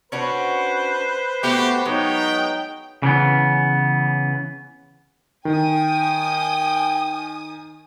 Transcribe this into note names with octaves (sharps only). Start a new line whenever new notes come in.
C#4 D4 F#4 B4 C5
A3 B3 F#4 G4
F#3 G#3 B3 D#4 C#5 G5
C#3 E3 B3
D#3 G5 G#5 D#6